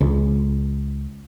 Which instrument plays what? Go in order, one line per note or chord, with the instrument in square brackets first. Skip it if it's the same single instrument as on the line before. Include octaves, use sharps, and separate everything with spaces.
[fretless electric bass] C#2